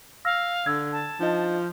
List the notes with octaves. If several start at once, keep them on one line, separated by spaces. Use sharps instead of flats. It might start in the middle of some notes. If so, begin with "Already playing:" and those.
F5 E6 F6 A#6
D3 E6 G#6
A5
F3 D4 D#4 D#5